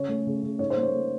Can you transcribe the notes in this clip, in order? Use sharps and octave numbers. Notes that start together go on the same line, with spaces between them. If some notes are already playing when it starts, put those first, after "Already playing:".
Already playing: C#3 C#4 C#5
A3
C#3
C#3
D#4 C#5
C5
A#3
C#5
A#3